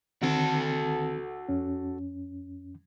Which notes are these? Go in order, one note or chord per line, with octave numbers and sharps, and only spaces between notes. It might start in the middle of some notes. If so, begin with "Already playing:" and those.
D3 D#3 C4 F#4 A4
F2 C#4